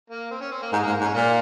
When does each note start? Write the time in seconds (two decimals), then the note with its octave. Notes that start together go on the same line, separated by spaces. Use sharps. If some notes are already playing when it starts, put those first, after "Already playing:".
0.10 A#3
0.31 C4
0.41 C#4
0.52 C4
0.62 A#3
0.73 G#2 G#3
0.83 G#2 A#3
1.01 G#2
1.04 C#4
1.14 A#2 A#3